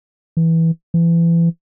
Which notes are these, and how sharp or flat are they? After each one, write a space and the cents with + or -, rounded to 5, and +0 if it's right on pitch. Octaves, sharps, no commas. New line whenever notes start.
E3 -10
E3 +30